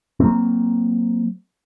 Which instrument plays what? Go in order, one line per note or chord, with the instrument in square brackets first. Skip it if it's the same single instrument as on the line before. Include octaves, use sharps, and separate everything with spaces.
[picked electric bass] F#3 A#3 C4